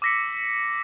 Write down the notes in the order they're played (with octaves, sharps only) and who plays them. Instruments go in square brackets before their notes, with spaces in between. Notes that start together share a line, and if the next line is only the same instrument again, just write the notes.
[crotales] D6 E6 A#6 B6 C#7